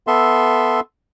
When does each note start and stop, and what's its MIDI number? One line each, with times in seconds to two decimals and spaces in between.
0.07 0.80 59
0.07 0.80 69
0.07 0.80 76
0.07 0.80 84